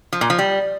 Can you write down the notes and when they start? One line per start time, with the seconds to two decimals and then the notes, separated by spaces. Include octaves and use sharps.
0.13 F3
0.21 A#2
0.30 F3
0.39 G3